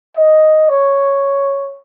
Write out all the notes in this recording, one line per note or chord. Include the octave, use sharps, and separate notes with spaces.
D#5
C#5